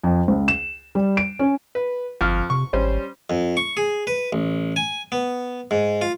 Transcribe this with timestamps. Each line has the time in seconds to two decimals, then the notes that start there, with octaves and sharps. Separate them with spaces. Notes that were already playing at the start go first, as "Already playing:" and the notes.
0.04 F2
0.28 C#2
0.48 E7
0.95 G3
1.17 D7
1.39 C#4
1.75 B4
2.21 G1 F2 F6
2.50 C3 C#6
2.73 G#1 G3 C#4 C5
3.30 F2
3.57 C#6
3.77 G#4
4.07 B4
4.33 A1
4.76 G#5
5.12 B3
5.71 G#2
6.02 F4